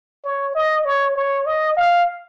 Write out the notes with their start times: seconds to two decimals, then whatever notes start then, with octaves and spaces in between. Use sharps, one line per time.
0.24 C#5
0.55 D#5
0.85 C#5
1.16 C#5
1.46 D#5
1.76 F5